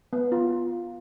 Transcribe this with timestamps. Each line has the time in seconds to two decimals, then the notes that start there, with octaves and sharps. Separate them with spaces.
0.13 B3
0.32 F4